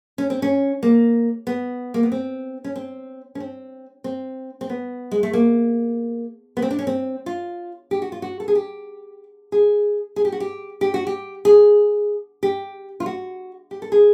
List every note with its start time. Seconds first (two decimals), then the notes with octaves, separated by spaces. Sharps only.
0.18 C#4
0.30 C4
0.42 C#4
0.83 A#3
1.47 B3
1.94 A#3
2.03 B3
2.12 C4
2.64 C#4
2.76 C4
3.35 C#4
3.40 C4
4.04 C4
4.61 C4
4.70 B3
5.11 G#3
5.23 A3
5.33 A#3
6.57 B3
6.62 C4
6.71 D4
6.79 C#4
6.87 C4
7.26 F4
7.91 G4
8.02 F#4
8.12 F4
8.22 F#4
8.40 A4
8.48 G#4
8.55 G4
9.52 G#4
10.16 G#4
10.25 G4
10.32 F#4
10.40 G4
10.81 G4
10.94 F#4
11.07 G4
11.45 G#4
12.43 G4
13.00 F4
13.06 F#4
13.71 G4
13.82 A4
13.92 G#4